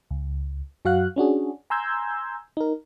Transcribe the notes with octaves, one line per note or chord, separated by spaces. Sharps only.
C#2
F#2 F#3 F#4 F5 F#5 F#6
C#4 D4 F#4 G#4
G#5 A#5 C6 E6 G6 G#6
D#4 A#4